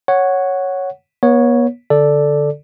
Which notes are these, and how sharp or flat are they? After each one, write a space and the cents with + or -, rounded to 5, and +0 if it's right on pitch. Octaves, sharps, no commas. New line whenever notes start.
C#5 +0 F#5 +0
B3 -40 C#5 +0
D3 -10 A4 +0 D5 +0